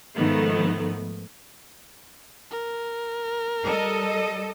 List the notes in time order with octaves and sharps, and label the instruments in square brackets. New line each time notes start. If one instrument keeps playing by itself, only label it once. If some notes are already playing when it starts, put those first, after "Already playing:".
[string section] G#2 D#3 F3 A3 B3
[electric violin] A#4
[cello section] G3 A4 D#5